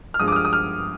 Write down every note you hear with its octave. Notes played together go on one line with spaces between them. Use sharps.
F6
G2 F3 G#3 D#6
D6
D#6
F6
D#6
F6